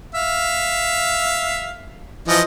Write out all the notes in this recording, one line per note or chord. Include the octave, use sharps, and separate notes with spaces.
E5 F5
E3 F3 D#5